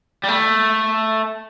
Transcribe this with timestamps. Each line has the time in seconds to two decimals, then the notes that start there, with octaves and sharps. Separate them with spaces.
0.24 G3
0.28 A3